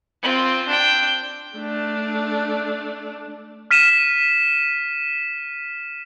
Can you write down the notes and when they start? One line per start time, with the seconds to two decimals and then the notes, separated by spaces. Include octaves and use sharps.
0.23 C4 F4
0.67 D4 G5
1.56 A3 D4
3.71 F6 B6 D#7 E7